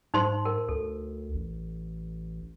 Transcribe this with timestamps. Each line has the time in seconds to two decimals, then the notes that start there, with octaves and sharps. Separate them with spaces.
0.14 G#2 D#4 C5 C6
0.45 A#4
0.69 D2 A4
1.35 A1